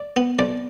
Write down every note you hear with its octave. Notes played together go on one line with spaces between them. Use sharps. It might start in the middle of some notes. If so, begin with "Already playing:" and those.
Already playing: D5
B3
B1 D5